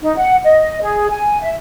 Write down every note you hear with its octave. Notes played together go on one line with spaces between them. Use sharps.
D#4
F#5
D#5
G#4
G#5
E5